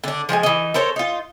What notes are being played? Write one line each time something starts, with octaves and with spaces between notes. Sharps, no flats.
D3 D4
F3 G#3 G#4 G#5
E3 D#4
A4 A#4 C5 C#5
D#4 F4